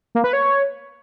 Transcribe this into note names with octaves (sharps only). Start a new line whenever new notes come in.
A#3
B4
C#5